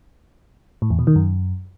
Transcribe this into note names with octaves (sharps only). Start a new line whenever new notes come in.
A2
E2
B2
D#3
F#2